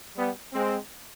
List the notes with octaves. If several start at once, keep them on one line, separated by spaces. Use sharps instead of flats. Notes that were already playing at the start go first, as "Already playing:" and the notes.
G3 B3
G#3 C4